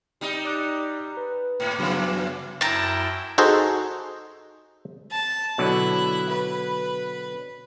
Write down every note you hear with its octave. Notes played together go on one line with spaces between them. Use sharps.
G3 D#4
D5 D6 F#6
B4
G#2
F#2 C#3 E3 F#3 B3
F#2 E4 G5 A5 A#5
D#4 F#4 G#4 A4 C5 D#5
A5
B2 D3 F#3 E4 F#6
B4